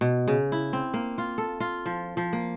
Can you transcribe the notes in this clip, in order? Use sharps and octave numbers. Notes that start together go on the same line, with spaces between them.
B2
C#3
E4
C4
A#3
F4
A4
F4
F3
F3
A#3